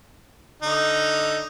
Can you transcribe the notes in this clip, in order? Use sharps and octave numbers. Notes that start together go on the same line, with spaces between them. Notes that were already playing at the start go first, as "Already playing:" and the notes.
D3 D#4